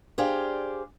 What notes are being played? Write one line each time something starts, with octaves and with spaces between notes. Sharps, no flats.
D4 G4 G#4 C5 D5 F5